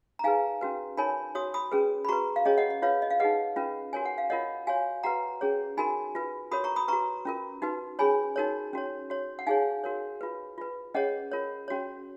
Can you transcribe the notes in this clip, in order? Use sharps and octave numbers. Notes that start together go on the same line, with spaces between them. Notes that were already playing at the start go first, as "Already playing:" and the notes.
A#5
D#4 G#4 B4 F5 G#5
C#4 F#4 B4
D#4 A#4 C#5 G#5 B5
F#4 C#5 D#6
B5 D#6
C#4 G#4 B4
B5
F#4 B4 A#5 C#6
F5
C#4 G#4 C#5 D#5
D#5 F#5
D#5
F4 B4 C#5 F5
D#5
F5
D#4 G#4 B4 D#5 F#5
C#4 F4 B4
F#4 A#4 C#5 G#5
F#5
F5
F4 A#4 C#5 D#5 F#5
F#4 C#5 F5 G#5
F#4 B4 F#5 A#5
C#4 G#4 C#5
D#4 F#4 A#4 G#5 B5
F4 B4
F#4 A#4 C#5 B5 D#6
A#5 C#6
B5 D#6
F#4 B4 A#5 C#6
C#4 F4 A#4
D#4 F#4 B4
C#4 G#4 C#5 G#5 B5
D#4 F#4 A#4 C#5
C#4 F#4 C#5
F#4 C#5
F#5
D#4 G#4 C#5 F5 G#5
F#4 A#4 C#5
F4 B4
F4 B4
C#4 G#4 C#5 D#5 F#5
F4 A#4 C#5
C#4 F#4 C#5